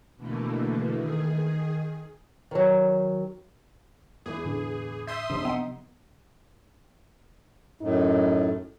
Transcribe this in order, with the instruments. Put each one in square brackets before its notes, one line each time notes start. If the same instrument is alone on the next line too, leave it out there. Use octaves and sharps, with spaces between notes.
[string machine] B2 D3 E3 A3 A#3
D#3 G#4
[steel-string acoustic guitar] D#3 F#3
[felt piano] E2 E3 [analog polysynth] G#4
[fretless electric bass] A2 D3 D4
[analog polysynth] E5 C6 D#6 [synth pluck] G6
[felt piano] F#1 [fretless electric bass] C3 F3 D4
[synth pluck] B3 F#5 [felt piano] D#4
[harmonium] F#2 A2 [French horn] D#4